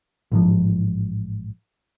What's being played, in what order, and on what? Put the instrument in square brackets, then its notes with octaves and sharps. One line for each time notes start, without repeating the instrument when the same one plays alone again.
[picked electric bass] A1 G#2 F3